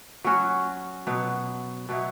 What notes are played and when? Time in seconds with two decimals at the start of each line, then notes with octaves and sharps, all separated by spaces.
0.24 F#3 C#4 F#4
1.07 B2 F#3 B3
1.89 B2 F#3 B3 E4